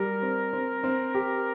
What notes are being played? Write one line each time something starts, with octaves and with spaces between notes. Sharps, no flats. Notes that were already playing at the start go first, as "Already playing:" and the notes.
Already playing: G3 A#4
C4
C4
C4
G4